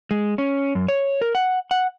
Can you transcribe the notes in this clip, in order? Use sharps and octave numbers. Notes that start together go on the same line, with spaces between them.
G#3
C#4
F#2
C#5
A#4
F#5
F#5